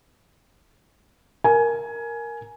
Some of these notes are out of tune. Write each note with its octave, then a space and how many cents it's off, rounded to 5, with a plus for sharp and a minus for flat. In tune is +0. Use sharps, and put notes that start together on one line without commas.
A#4 +0 G#5 +15